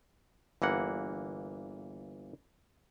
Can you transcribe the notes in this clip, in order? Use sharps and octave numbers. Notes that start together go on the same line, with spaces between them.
G1 E3 A#3 F#5